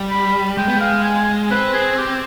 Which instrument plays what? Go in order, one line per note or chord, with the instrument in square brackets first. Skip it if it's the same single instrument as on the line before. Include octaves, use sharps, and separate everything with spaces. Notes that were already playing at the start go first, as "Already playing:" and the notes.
Already playing: [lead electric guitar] G3
[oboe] B5
[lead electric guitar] G#3 [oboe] G5
[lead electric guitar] B3
[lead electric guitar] G#3 [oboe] F5
[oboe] G#5
[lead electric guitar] C4 [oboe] B4
[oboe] G#4
G4